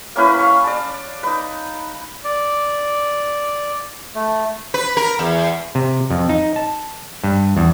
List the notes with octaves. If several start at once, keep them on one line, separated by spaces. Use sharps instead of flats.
A#3 C#4 E4 B4
F5 C#6
D5 A5
D#4 B4
D5
A3
B4
A#4
E2
C3
F2
D#4
A5
G2
E2